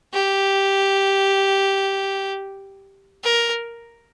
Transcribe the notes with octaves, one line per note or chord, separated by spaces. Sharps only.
G4
A#4